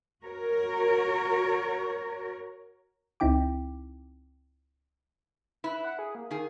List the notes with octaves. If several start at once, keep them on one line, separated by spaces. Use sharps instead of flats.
F#4 A#4 C#5
C#2 C4 D#4 E4 G5 D6
E4 B4
F#5
G#4
A#3
D#3 G#4